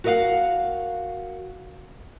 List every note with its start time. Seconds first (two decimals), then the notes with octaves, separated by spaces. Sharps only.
0.04 F#4 A#4 B4 D#5 F5 F#5